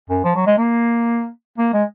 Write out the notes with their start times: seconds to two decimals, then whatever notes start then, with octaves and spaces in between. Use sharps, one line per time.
0.09 F#2
0.24 F3
0.35 F#3
0.46 G#3
0.58 A#3
1.58 A#3
1.73 G#3